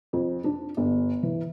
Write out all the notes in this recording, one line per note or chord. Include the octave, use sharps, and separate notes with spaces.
F2
D4
G1
E3